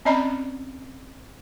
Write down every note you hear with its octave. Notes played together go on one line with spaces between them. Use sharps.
C4 C#4 D5 D#5 A#5 B5